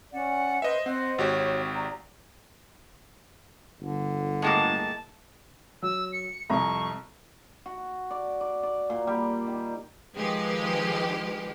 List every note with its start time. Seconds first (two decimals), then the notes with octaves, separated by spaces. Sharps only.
0.12 C#4 D5 F#5
0.62 B4 C5 D#5 E5
0.86 C4 C5 D#5 F#5
1.18 G#1 F#4 G4 C#5
1.75 D5 A#5
3.81 G1 D3
4.42 A2 G#3 A#3 A5
5.82 F#3 E6
6.13 C#7
6.50 C2 F2 A#5 C#6
7.66 F#4
8.11 D5
8.41 D5
8.63 D5
8.90 A#2
9.07 G3
9.47 D#3
10.15 D#3 F3 G#3 G4 B4